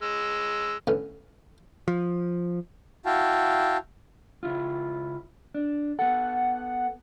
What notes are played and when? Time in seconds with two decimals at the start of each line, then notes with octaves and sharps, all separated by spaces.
0.02 G#3 E6
0.87 A2 D3 B3 C#4
1.88 F3
3.06 E4 F#4 F5 G5 A5
4.43 C#2 E4 F4
5.55 D4
5.99 B3 A4 F#5